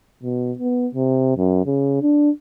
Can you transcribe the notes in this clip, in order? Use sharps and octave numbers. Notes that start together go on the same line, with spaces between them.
B2
B3
C3
F#2
C#3
D4